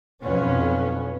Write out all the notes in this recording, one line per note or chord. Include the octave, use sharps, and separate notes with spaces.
B1 F2 B3 C#4